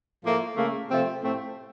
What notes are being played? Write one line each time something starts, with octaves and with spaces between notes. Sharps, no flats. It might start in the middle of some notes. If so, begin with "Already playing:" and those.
A2 F3 A3 A#3
C#3 A3 A#3
C3 F3 A3 C4
A2 A3 C4